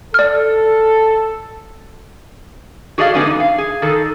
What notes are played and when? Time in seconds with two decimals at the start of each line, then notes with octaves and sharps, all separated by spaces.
0.14 A4 D5 F6
2.98 F#4 G#4 A4 D5 D#5 F5
3.14 D3 G#3 B3 C#4 D#4 F#4
3.25 E2 D#4
3.40 F5
3.58 G#4
3.82 D#3 D#4 A4